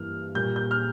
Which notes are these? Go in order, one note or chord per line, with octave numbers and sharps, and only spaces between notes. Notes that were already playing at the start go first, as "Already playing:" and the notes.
Already playing: G2 E3 A#3 F6
A#2 G3 A#3 G6
G6
F6